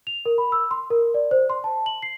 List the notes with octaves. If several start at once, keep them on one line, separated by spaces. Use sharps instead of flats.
F7
A#4
B5
E6
C6
A#4
D5
C5
C6
A5
F#7
C7